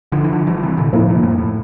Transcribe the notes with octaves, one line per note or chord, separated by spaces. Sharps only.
D3 F3
E3
D3 F3
E3 G3
F3
C3 E3
A#2 D3
A2 C3 F3 A#3 E4
G2 A#2
F2 A2
A2